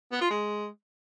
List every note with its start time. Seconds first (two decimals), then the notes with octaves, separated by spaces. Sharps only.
0.12 B3
0.21 F4
0.30 G#3